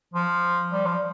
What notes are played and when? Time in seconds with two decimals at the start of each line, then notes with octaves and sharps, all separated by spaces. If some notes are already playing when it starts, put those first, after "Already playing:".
0.14 F3
0.72 G3
0.86 F3